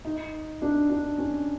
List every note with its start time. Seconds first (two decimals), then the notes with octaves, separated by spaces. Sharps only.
0.05 D#4
0.62 D4
0.90 D4
1.18 C#4